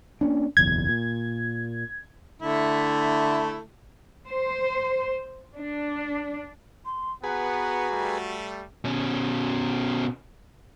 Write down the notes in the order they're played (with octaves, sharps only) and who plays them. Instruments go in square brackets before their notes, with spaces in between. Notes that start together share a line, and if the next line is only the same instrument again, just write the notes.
[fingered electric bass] A#3 C#4 D4
[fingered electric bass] F#1 B1 E2 [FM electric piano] G#6
[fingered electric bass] A#2
[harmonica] D3 A3 E4
[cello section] C5
D4
[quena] C6
[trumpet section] B3 F#5 [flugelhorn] F#4 [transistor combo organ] G#4 B4 [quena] A#5
[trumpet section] G3 A3
[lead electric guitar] B2 C#4